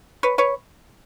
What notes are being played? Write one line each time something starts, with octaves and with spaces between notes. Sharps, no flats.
B4 C#5
B4 C#5